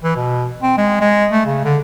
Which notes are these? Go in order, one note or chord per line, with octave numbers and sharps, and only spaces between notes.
E3
B2
C4
G#3
G#3
A3
C#3
D3